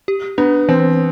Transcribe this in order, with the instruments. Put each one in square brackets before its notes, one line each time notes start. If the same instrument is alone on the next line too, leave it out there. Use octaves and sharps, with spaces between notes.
[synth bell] G4
[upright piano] B3 [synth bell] D4
[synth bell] E3 [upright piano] C4